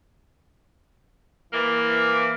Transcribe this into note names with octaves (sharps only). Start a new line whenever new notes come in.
E3 A#3